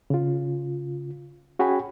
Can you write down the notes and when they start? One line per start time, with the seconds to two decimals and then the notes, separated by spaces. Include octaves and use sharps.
0.10 C#3 F4
1.59 C#4 F#4 G#4 G5 G#5 B5